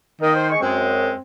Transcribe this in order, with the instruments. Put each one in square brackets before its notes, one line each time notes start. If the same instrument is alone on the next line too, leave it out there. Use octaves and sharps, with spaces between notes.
[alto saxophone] D#3 [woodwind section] A#3 A#4 D#5
[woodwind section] C5
G#3 C#6
[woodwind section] F#2 G#3 [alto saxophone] C4